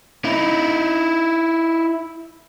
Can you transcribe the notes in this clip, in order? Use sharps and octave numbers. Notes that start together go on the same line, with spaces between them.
D#4 E4